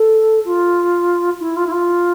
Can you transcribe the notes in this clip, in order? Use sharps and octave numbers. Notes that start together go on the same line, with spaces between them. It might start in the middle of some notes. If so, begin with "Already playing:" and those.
Already playing: A4
F4
E4
F4
E4
F4